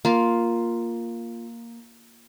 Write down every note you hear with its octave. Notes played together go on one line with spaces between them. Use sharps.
A#3 F4